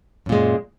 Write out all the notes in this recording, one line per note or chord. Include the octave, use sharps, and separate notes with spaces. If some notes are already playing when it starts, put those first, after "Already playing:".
F#2 A#2 G#3